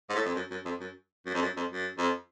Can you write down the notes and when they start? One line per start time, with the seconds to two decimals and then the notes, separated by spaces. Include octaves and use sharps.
0.10 G#2
0.15 A2
0.25 F2
0.35 F#2
0.51 F#2
0.65 F2
0.81 F#2
1.26 F#2
1.34 F2
1.42 F#2
1.57 F2
1.72 F#2
1.98 F2